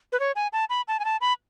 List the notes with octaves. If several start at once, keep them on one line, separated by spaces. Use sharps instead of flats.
B4
C#5
G#5
A5
B5
A5
G#5
A5
B5